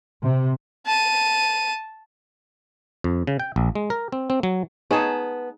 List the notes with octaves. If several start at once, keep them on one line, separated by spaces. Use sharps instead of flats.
C3
A5 D#7
F2
C#3
G5
A#1
G#3
A#4
C4
C4
F#3
B3 D#4 G#4 C#5 A5